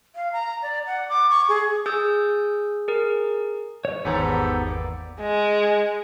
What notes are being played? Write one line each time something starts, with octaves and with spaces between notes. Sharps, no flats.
F5
A#5
D5
F#5
D6
C#6
G#4
G#4 D#6 E6 G6
G#4 A#4
C#5
G#1 E2 G#2 B3 G4 A4 A#5
A#3 D5
G#3